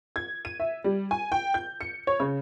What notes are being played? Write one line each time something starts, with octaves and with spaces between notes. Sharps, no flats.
G#6
D#7
E5
G3
G#5
G5
G6
C#7
C#5
C#3